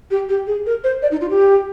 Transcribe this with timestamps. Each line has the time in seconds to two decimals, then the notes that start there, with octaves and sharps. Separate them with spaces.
0.11 G4
0.29 G4
0.47 G#4
0.66 A#4
0.84 C5
1.02 D5
1.11 D#4
1.21 F4
1.30 G4